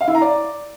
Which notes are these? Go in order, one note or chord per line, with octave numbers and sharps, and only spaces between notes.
F5
E4
A#5
D5